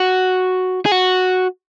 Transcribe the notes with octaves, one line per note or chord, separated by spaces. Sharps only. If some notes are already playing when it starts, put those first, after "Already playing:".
Already playing: F#4
G#4
F#4